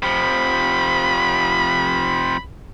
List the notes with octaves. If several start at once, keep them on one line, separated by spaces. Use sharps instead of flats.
C3 F3 B5